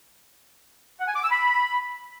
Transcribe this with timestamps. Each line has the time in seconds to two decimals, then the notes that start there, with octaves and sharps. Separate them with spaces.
1.00 F#5
1.08 G#5
1.16 D6
1.24 E6
1.31 B5